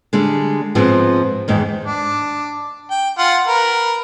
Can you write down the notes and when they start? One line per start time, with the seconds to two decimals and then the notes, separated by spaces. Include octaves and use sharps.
0.13 D3 G3 G#3
0.75 G#2 F3 B3 C4
1.48 E2 G#2 D#3
1.85 D4
2.91 G5
3.18 F4 F#5
3.47 A#4 B4